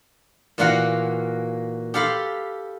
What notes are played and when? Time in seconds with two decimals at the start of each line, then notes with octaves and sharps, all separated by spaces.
0.58 A#2 E3 A#3 F#4 F5 F#5
1.94 G4 A4 F5 B5 C6